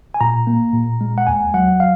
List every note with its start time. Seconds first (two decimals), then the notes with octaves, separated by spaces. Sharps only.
0.14 G#5
0.21 A#2 A#5
0.47 A#3
0.73 A#2
1.01 G#3
1.18 F#5
1.27 D#2 G#5
1.54 F#3 F#5
1.80 F5